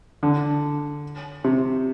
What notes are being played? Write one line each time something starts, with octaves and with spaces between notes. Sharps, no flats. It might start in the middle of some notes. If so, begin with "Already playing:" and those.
D3
C3